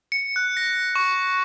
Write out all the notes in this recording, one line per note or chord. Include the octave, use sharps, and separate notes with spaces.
C#7
F#6
A#6
C#6